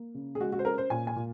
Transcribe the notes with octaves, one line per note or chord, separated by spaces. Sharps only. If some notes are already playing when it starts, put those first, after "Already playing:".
Already playing: A#3
C#3
G#4
G#3 F#4
F#4
C5
C#4 A#4
C5
A#2 G#5
G#5
A#2